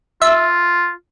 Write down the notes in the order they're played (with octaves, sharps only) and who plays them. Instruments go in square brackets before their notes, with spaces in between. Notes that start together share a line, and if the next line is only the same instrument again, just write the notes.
[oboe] F4 [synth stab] E5